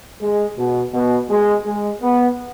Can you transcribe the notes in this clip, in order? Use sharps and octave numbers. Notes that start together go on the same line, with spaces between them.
G#3
B2
B2
G#3
G#3
B3